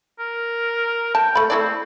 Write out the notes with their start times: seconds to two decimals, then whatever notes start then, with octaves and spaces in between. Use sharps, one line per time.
0.19 A#4
1.15 G5 A5
1.35 A3 B5
1.50 A3 C4 E4 D5